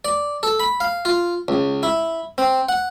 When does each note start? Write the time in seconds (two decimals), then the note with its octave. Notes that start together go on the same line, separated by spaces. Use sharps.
0.05 D5
0.43 A4
0.60 B5
0.80 F5
1.05 F4
1.48 C#2
1.83 E4
2.38 C4
2.69 F#5